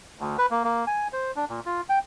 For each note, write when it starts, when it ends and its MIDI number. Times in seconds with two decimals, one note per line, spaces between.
0.19 0.36 38
0.38 0.46 71
0.51 0.63 58
0.64 0.85 58
0.87 1.08 80
1.13 1.31 72
1.36 1.45 62
1.49 1.60 46
1.66 1.81 65
1.89 1.99 79